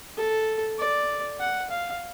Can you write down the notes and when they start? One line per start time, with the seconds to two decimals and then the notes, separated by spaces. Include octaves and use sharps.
0.17 A4
0.79 D5
1.40 F#5
1.70 F5